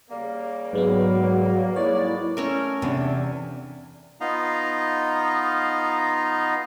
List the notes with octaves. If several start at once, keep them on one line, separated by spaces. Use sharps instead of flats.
C#3 G3 A#3
G#2 F#3 G#3 B3 B4
G#2 G3 G#3 A#3 E4 C#5 D5
A3 C#4 A#4
E2 C3 D4
B3 D#4 F4 D#5 F5 A#5